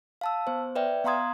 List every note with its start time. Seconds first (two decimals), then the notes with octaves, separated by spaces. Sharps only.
0.21 F5 A5 E6
0.47 B3 C5
0.75 B4 D5 E5 G5
1.04 B3 F5 A#5 C6 D#6 G#6